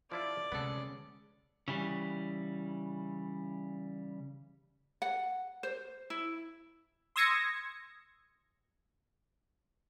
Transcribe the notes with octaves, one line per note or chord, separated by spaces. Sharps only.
F3 E4 F4 D5
D2 C3 G#3 B3 C#4 A4
C#3 E3 G3
F#5
C5
E4
C6 D#6 E6 G#6 A#6 C#7